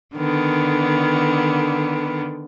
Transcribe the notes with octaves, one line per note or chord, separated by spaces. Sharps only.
D3 D#3 B3